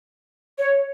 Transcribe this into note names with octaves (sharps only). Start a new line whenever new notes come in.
C#5